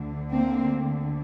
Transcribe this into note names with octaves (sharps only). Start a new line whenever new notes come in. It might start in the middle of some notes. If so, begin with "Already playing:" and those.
Already playing: D2 D3
A#3 C4